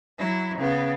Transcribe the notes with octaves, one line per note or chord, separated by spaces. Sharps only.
F#3 E4
C#3 B3